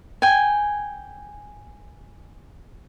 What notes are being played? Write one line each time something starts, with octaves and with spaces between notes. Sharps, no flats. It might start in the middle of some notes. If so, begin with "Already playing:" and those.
G5 G#5